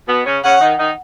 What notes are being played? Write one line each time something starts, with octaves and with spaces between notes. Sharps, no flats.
B2 B3
C#3 C#4
C#3 C#4 F#5
D#3 D#4
D#3 D#4